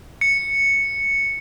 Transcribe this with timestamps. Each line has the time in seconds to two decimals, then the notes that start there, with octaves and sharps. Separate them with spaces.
0.21 C#7